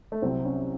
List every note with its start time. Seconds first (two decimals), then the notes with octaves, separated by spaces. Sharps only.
0.12 A3
0.22 C2 C3 F#3 C4
0.45 C#4